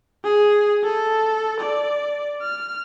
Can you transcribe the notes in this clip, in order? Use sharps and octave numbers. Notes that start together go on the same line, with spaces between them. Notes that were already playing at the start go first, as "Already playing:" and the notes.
G#4
A4
D5
F6